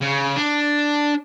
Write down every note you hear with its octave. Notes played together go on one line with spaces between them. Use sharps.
C#3
D4